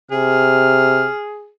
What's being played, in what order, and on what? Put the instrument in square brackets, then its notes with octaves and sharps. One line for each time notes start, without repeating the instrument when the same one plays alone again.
[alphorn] C3 [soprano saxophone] G#4 [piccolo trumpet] F6